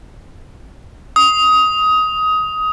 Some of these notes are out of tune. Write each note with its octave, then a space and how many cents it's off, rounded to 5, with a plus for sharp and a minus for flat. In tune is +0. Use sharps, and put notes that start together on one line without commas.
D#6 +20